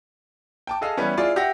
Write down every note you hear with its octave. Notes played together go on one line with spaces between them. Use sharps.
G5 A5 D6
G#4 A4 D#5 F5 E6
E3 G3 B3 C#4
E4 F4 G#4 D5
G4 E5 F#5 A#6